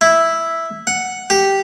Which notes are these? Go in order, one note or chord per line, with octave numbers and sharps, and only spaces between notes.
E4
F#5
G4